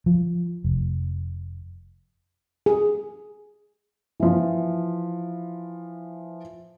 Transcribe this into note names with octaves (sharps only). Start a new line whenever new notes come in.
F3
F1
G#4
E3 F3